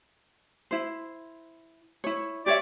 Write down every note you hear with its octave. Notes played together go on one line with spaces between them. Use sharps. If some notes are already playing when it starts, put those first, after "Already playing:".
E4 C5
E4 C#5
G4 C#5 D5 E5